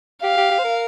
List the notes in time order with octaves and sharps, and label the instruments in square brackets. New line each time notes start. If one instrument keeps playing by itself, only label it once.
[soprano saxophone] G4 [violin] F5
[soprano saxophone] G4
G4
C5
A#4